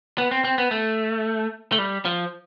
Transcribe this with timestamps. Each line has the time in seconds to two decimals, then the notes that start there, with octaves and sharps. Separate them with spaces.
0.18 B3
0.31 C4
0.45 C4
0.58 B3
0.71 A3
1.72 A3
1.79 G3
2.05 F3